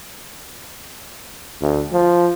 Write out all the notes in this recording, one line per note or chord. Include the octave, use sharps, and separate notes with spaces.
D2
F3